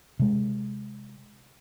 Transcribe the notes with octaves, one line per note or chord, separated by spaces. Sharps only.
C3 G#3